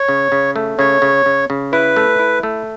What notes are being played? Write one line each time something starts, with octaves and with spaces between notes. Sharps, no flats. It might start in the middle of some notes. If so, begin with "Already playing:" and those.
Already playing: C#5
C#3
C#3
A3
C#3 C#5
C#3
C#3
C#3
E4 B4
A3
E4
A3